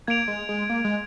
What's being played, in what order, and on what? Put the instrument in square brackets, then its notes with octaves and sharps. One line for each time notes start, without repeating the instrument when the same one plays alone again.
[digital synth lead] A#3 [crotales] G#6 D7 F7
[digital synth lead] G#3
G#3
A#3
G#3